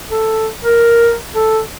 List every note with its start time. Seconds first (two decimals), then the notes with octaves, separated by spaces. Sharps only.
0.10 A4
0.64 A#4
1.35 A4